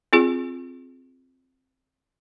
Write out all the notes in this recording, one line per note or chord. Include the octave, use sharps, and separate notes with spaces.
C4 F4 G#4